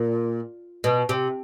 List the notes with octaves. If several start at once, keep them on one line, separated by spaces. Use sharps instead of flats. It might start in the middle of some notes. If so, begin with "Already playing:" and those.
Already playing: A#2
B2
C3